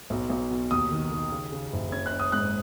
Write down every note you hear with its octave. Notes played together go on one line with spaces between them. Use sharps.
B1
B1
B2
D#2 D#6
D#3
D#3
C#3
C#3
F#1
C#4 G#6
F#6
C#4
D#6
G#2 F#6